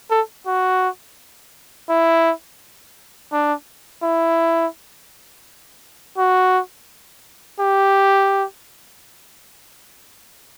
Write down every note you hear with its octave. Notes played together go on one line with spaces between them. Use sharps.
A4
F#4
E4
D4
E4
F#4
G4